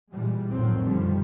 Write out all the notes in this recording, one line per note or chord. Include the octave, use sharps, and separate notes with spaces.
A#2 E3 G3 G#3
A1 F2 D#3 F3 F#3 C4
F#2 B2 D#3 F3 G3